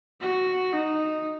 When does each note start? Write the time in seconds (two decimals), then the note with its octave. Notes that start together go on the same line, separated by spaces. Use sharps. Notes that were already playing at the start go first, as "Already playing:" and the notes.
0.21 F#4
0.72 D#4